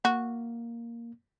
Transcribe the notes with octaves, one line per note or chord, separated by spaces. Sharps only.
A#3 F#4